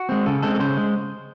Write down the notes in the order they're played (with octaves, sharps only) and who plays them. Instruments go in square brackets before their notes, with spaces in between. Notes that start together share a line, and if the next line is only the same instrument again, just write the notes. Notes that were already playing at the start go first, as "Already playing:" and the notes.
Already playing: [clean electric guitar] F#4
G#3 C4
C#3 A4
G#3 C4 A4
A4
C#3 C5
G#3